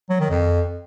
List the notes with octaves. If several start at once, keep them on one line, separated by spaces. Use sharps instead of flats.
F#3
D#3
F2